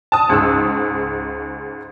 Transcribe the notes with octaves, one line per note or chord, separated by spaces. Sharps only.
A5 D#6
C#2 G#2 E6